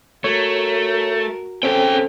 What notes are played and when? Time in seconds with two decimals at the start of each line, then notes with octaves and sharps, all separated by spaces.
0.24 A3 F#4 A#4 C#5
1.63 C4 C#4 G#4 A4 G5